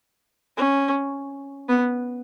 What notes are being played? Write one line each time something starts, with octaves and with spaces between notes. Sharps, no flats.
C#4
B3